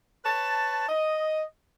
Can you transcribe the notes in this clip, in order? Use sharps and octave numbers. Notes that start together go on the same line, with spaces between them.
B4 C#5 A5
D#5